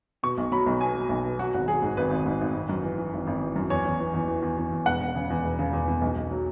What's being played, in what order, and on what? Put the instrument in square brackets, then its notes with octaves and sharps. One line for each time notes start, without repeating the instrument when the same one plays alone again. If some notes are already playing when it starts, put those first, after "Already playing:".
[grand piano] B2 C#6
B1
F#3 B5
B1
B2 G#5
F#3
B1
B2
F#3 F#4
G#1 F#4
F#3 G#4
G#2
G#1 B4
G#1
G#2
G#1
G#1
F#2
E3
E3
G#1
G#1
E3
F#2
E2 C#5
E2
E3
E2
E3
E2
E2
E2
E1 F#5
E1
C#3
E2
E1
C#3
E2
E2
B1
B1
F#3